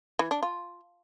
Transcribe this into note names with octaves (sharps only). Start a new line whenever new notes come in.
E3
D4
F4